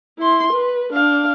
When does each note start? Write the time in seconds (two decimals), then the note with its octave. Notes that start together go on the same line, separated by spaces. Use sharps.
0.19 E4 C6
0.53 B4
0.93 D4 F5